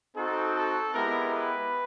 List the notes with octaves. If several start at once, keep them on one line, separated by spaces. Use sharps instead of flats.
C4 D#4 F#4 A4
A4
G#3 B3 E4 G4 A#4
B4